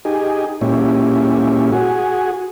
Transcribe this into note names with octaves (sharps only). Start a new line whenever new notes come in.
D#4 G4 G#4
A#2 G#3 C#4 E4 G4
F#4 G#4